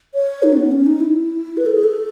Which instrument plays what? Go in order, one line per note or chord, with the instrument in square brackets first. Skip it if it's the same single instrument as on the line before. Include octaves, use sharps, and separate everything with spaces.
[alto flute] C#5
D#4
C#4
B3
C#4
D#4
E4
B4
A4
G#4
A4